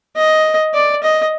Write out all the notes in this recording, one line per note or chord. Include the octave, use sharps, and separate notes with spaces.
D#5
D5
D#5